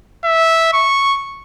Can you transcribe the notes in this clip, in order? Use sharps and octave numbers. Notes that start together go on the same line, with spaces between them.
E5
C#6